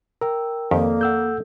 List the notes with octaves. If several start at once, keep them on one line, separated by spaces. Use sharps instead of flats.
A#4 G5 E6
F2 D#3 A#3 G4 A4 D5 F5
A4 F#5 E6 G6